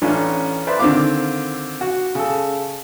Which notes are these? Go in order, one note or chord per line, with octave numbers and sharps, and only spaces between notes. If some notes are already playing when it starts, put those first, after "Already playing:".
A1 C#4 D4 F4
B4 C5 D5 E5 C6
D3 D#3 C4 F4 F5 D6
F#4
C#3 A4